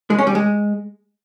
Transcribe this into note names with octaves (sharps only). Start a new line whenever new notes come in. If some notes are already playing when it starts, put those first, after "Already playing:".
G#3
C#4
G3
G#3